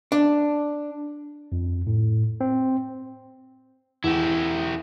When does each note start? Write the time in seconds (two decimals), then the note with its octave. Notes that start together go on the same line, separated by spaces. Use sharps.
0.12 D4
1.52 F2
1.87 A2
2.41 C4
4.04 E2 E4 G4